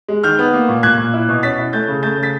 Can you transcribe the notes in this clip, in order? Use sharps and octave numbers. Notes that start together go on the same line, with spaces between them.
G#3
D#3 F6 G6
B3
A#3
A#2
A#2 F#6 G#6
A#2
E4
B2
C#4 A6 B6
E4
A3 G6 A6
C#3
A3 G6 A6
C#3
A6 B6